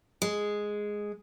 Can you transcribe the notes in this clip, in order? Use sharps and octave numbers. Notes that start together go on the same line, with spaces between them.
G#3